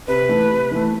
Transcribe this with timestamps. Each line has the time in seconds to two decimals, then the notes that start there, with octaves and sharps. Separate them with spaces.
0.08 C3 B4
0.29 E3 A3
0.50 C3
0.71 E3 A3